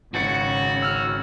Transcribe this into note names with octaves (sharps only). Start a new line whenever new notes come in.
G#1 C#3 F#4 A6 C#7
E6 F6